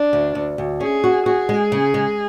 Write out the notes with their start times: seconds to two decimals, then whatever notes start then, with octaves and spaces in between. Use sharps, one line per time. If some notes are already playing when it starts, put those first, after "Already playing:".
Already playing: D4
0.13 D2
0.35 D2
0.58 D2
0.80 C#4 G#4
1.04 F#4
1.26 F#4 G#4
1.49 G#3
1.72 C#3
1.94 G#3